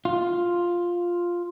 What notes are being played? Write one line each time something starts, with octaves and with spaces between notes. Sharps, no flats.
F4